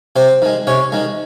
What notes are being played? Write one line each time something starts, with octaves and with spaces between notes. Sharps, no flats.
C3 C4 C5
D#3 G#3
C3 C#4 C#5
D#3 G#3